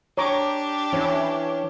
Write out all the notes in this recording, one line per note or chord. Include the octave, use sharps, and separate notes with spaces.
D4 G4 C#5 A#5 D6
E3 C#4